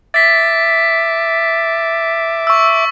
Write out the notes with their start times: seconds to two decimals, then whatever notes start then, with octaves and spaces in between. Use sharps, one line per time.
0.14 E5 D6 A6 B6
2.47 C#6 E6